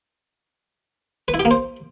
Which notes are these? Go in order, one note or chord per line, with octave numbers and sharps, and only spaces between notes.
B4
E4
G4
A#3
C5